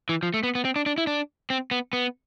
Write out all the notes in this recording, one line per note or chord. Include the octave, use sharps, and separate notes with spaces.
E3
F3
A3
B3
B3
C4
D4
D4
E4
D4
C4
B3
B3